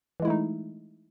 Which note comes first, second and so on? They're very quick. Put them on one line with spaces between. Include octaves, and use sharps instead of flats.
E3 G#3 E4 A3 D#4